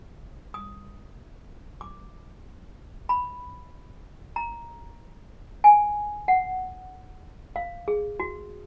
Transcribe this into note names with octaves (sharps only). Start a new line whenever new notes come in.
D#6
D6
B5
A#5
G#5
F#5
F5
G#4
F#4